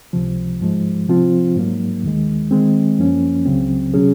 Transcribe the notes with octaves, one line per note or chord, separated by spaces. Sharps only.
C#2 C3 F3
G#2 F3 G#3
C3 F3 C4 F4
G#2 F#3 A#3
D#2 D#3 G#3
D#3 G#3 C4
F#2 F3 A#3 C#4
C#2 C#3 F#3 C4
C3 F#3 C#4 G#4